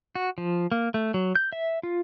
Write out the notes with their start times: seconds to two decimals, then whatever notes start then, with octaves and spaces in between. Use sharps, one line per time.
0.15 F#4
0.38 F3
0.72 A#3
0.94 A3
1.14 F#3
1.35 G6
1.53 E5
1.83 F4